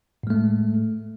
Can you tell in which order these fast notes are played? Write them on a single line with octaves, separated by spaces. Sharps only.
A2 G#3 A3